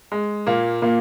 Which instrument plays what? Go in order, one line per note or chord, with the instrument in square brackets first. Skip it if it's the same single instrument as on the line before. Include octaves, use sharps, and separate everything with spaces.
[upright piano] G#3
A#2 A#3
A#2 A#3